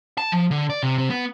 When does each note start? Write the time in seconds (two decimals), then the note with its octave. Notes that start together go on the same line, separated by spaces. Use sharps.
0.18 A5
0.32 F3
0.51 D3
0.70 D5
0.83 C3
0.98 C3
1.10 B3